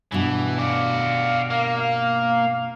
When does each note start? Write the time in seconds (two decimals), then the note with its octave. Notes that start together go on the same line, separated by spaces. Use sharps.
0.12 G2 B2 E3
0.59 F#4 D5 F5
1.51 A#3
1.80 F5